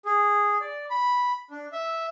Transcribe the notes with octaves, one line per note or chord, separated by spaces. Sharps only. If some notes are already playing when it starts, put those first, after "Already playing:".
G#4
D5
B5
D4
E5